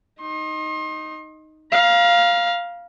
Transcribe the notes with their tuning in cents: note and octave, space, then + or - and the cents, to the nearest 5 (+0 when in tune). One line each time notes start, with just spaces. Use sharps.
D#4 +0 C6 +35
F5 +0 A#5 +40